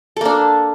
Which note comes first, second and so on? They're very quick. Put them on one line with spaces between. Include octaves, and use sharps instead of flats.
A4 A#3 D4